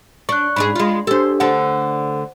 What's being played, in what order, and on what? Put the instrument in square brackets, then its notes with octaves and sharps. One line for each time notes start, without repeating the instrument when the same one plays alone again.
[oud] D4 [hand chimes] C#6 F#6
[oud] G#2 D4 G#4 [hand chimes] B5
[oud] G#3 F4
[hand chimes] D4 G4 [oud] A4 C5
[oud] D2 D3 A4 [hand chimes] C5 F#5